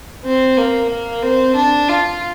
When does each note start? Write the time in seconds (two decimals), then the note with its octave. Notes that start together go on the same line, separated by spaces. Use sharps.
0.25 C4
0.57 A#3
0.90 A#3
1.23 C4
1.55 D4
1.88 F4